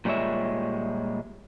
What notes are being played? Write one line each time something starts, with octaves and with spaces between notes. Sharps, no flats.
A#2 G3 G#3 C#5 E5